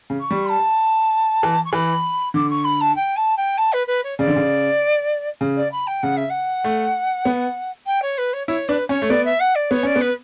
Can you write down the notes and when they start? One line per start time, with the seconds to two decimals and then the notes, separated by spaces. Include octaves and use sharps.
0.10 C#3
0.20 C#6
0.31 G3
0.50 A5
1.43 E3
1.65 C#6
1.73 E3 B5
2.34 D3 D6
2.50 C#6
2.65 B5
2.81 A5
2.96 G5
3.17 A5
3.37 G5
3.58 A5
3.73 B4
3.87 B4
4.04 C#5
4.18 C#3 D5
4.28 D3
4.36 C#3
5.41 C#3
5.57 D5
5.72 B5
5.87 G5
6.03 C#3 F#5
6.17 E5
6.30 F#5
6.64 A3
7.25 B3
7.87 G5
8.02 C#5
8.18 B4
8.33 C#5
8.47 E4 C#5
8.68 D4 B4
8.89 C#4 C#5
9.02 A3
9.10 B3 D5
9.25 E5
9.40 F#5
9.55 D5
9.71 B3 C#5
9.83 C#4 D5
9.96 B3
10.01 B4